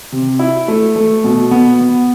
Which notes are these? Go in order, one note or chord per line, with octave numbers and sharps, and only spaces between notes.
C3
E4
A3
A3
B2
B3
B3